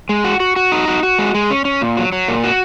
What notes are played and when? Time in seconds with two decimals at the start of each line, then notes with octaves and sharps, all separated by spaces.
0.09 G#3
0.24 F#4
0.40 F#4
0.56 F#4
0.72 D#4
0.88 F#4
1.03 F#4
1.19 G#3
1.34 G#3
1.50 C#4
1.65 C#4
1.81 A#2
1.97 F#3
2.12 F#3
2.28 A#2
2.44 F#4